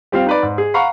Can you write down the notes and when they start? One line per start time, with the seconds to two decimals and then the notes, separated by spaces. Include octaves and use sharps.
0.12 G3 C4 F4 F5
0.26 D#4 B4 D5
0.42 G#2
0.58 G#4
0.74 F5 F#5 A#5 B5 C#6